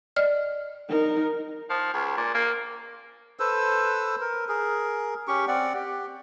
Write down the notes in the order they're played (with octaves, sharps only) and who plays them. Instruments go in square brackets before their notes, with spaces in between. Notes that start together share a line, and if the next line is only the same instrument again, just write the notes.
[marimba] D5 D#5 F6
[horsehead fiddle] D#4 A#4
[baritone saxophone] F3
C#2
A#2
A#3
[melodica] A4 B4 C5 E6
A#4
G#4 A#4
C#4 G4 C#6
C4 D5 F#5
G4